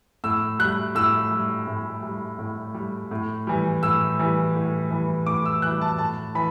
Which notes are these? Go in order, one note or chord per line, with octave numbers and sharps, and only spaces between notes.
A2 E6
G3 F#6
A2 E6
G3
A2
G3
A2
G3
A2
E3 G3
A2 E6
E3 G3
A2
E3 G3
A2 D6
E6
E3 G3 F#6
A5
A2 A5
E3 B5